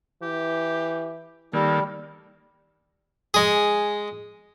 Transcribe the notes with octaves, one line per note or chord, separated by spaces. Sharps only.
E3 G4
D#3 G3 A#3 A4
G#3 G#4